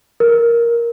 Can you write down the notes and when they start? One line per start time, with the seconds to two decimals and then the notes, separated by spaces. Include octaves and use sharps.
0.20 A#4